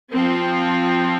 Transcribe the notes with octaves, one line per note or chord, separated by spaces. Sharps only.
F3 C4